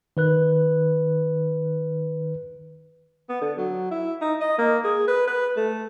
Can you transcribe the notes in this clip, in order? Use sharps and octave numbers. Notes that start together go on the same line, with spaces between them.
D#3 B4 F#6
B3
D3
F#3
E4
D#4
D#5
A#3
G#4
B4
B4
A3